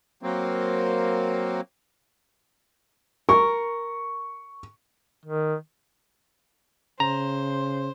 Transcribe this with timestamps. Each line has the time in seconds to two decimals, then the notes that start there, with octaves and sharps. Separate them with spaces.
0.23 F#3 A#3 C4
3.29 A#4 C#6
5.25 D#3
7.00 C#3 C5 A#5